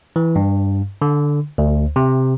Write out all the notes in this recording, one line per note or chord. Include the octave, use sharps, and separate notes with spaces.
E3
G2
D3
D2
C3